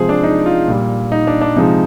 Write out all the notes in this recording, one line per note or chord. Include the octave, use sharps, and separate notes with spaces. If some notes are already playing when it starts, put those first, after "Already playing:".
Already playing: C3 F3 G#3 G#4 C5
D4
D#4
F4
A#2 G3
D#4
D4
D4
C3 F3 G#3 D#4